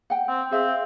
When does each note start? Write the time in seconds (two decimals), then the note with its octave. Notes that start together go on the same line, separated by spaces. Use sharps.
0.10 F#5 G5
0.28 C4
0.51 C4 G#4 E5 F5